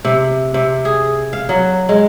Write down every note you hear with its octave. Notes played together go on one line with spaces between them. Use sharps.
C3
C3
G#4
F5
F#3
G#3